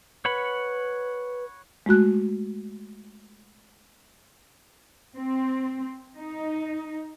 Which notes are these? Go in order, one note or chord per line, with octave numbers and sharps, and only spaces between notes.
B4 C#5 F#5 B5
G#3 A3 F#4 F#6
C4
D#4